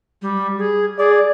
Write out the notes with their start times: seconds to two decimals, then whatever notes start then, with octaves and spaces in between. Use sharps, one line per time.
0.22 G3
0.59 G#4
0.99 G#4 D5